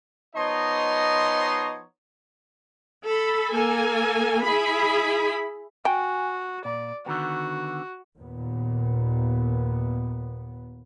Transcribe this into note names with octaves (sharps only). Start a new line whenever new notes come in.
F3 B3 D#4 C#5 D#5 C6
A4 B5
A#3 A4 G#5
E4 G#4 B5
F#4 G5 G#5
A#2 D5
D3 D#3 B3 F#4
D#2 A#2 B3